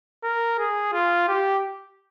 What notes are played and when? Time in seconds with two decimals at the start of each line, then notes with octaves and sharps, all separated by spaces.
0.23 A#4
0.58 G#4
0.93 F4
1.28 G4